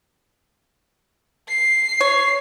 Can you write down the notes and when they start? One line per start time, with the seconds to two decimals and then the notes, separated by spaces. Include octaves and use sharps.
1.48 C7
2.00 C#5